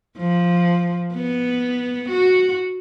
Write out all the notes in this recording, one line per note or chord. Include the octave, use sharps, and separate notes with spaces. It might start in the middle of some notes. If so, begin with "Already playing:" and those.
F3
B3
F#4